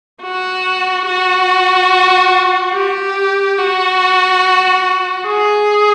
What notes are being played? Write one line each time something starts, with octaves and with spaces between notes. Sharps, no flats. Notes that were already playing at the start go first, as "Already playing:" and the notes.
F#4
F#4
G4
F#4
G#4